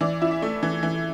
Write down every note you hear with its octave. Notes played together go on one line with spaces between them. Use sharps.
E3 D5
E4
E5
A3
E3
E3